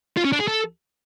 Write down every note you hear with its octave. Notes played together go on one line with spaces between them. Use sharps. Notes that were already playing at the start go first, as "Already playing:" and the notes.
F4
C#4
D4
G#4
A4